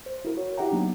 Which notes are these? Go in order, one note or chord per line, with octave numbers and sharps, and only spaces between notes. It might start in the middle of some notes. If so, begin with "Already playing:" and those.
C5
E4 F#4 A#4
F#4 C#5
E4 G4 E5 F#5 G5 A#5
F#3 A#3 B3 D4 D#4